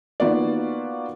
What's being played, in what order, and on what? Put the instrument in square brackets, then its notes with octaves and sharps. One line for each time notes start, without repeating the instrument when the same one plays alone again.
[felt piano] D#3 A#3 B3 F4 F#4 D5